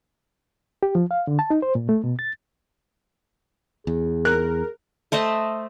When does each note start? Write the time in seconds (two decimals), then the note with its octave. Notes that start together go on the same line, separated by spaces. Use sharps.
0.83 G4
0.95 F3
1.11 F5
1.27 D3
1.39 A5
1.50 D#4
1.62 C5
1.75 A#2
1.89 A3
2.04 B2
2.19 A6
3.87 E2 G#4
4.25 A#4 F#6
5.12 A3 C5 D#5 E5